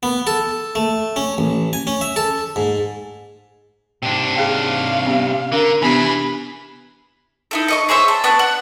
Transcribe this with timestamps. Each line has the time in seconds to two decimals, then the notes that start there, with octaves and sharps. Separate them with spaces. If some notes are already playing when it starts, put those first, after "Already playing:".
0.03 B3
0.27 A4
0.75 A3
1.16 C#4
1.38 A1
1.73 G#5
1.87 C#4
2.01 E5
2.16 A4
2.56 G#2
4.03 G#2 C3 D4 G5
4.36 G#4 F5 G5
5.06 B3 C#4 G4
5.52 D3 D4 A#4
5.82 C3 E3 B3 D4 G#4 B5
7.51 D#4 E4 A4
7.68 A4 D#5 C#6
7.89 G#4 C5 C#5 E5
8.08 A5
8.24 B3 D4 A5 C#6
8.39 F#5